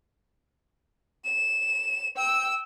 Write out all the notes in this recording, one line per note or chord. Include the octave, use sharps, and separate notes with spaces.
E7
G5 E6